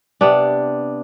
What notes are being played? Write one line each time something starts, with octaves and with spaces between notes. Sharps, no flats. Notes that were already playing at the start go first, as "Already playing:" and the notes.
C3 B3 D4